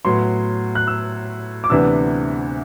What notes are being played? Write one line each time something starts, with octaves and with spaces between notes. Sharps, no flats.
A2 F#3 B3 C6
F#6
E6
D6
D2 C3 E3 B3 D4 E6